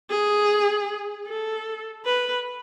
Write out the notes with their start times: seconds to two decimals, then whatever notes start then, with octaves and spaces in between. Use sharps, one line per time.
0.10 G#4
1.28 A4
2.06 B4